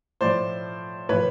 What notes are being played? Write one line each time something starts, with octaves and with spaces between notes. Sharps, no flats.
A2 F3 C5 D5
A2 F3 B4 C#5